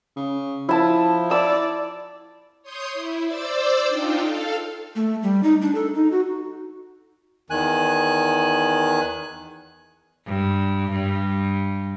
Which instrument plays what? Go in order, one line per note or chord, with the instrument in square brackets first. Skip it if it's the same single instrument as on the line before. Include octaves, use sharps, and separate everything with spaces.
[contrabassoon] C#3
[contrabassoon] F3 [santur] E4 A5
[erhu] D5 [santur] E6
[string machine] C#5 C6 D#6 G6
E4
C5 D5 D6 E6
D4 D#4 F4 G5
A4 F5
[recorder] A3
G3
D#4
D4
A4
D#4
F#4
[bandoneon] E2 D#3 G#5 F#6
[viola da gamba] G2
G2